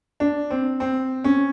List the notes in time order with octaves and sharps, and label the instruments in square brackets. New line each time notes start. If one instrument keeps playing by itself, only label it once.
[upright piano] D4
C4
C4
C#4